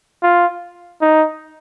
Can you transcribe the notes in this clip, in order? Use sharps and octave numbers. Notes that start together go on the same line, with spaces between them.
F4
D#4